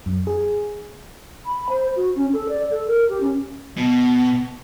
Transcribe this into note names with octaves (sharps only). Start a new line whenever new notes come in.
F#2
G#4
B5
C5
F#4
C#4
A4
D5
A4
A#4
G4
C#4
B2